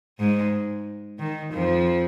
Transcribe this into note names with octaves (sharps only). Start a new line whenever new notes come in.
G#2 G#3
D#3
F2 F3